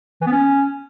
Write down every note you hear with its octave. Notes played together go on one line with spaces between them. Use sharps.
E3
B3
C#4